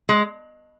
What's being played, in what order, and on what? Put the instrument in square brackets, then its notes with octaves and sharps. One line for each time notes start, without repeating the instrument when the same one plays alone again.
[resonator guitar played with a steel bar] G#3